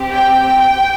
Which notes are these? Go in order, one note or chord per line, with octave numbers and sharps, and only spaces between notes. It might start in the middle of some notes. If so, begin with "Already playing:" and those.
Already playing: C4 G4
G5